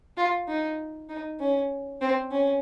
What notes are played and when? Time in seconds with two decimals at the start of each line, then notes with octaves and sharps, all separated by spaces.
0.17 F4
0.48 D#4
1.09 D#4
1.40 C#4
2.01 C4
2.31 C#4